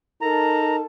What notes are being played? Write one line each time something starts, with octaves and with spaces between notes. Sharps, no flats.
D#4 A4 A#4 A5 A#5